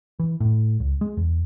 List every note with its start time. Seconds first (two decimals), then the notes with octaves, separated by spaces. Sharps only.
0.19 E3
0.40 A2
0.80 C#2
1.01 G#3
1.17 E2